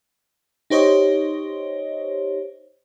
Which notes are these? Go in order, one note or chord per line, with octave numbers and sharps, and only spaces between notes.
D#4 G4 C5 C#5 D#5